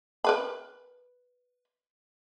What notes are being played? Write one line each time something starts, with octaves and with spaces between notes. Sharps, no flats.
A#4 B4 B5